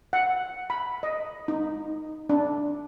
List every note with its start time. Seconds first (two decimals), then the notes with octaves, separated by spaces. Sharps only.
0.13 F#5
0.70 B5
1.03 D#5
1.48 D#4
2.29 D4